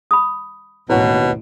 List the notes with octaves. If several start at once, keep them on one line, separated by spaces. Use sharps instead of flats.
B5 D#6
A1 D#2 B2 E4 B4 C#5 F#5